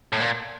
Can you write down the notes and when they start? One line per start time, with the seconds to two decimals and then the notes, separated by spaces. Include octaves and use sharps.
0.12 A2
0.20 A#2